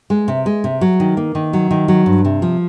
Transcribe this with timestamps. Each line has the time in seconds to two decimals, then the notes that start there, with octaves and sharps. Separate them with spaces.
0.10 G#3
0.28 C3
0.46 G#3
0.64 C3
0.81 F#3
1.00 D#3
1.17 A#3
1.35 D#3
1.53 F#3
1.71 D#3
1.88 F#3
2.06 G2
2.25 C3
2.42 F3